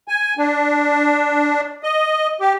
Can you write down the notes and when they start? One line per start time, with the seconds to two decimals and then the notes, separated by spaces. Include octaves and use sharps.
0.08 G#5
0.38 D4
1.83 D#5
2.40 G4